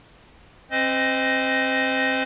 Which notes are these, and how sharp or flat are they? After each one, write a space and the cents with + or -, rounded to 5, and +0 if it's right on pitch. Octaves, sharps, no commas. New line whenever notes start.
C4 +30 C5 -35 D#5 +0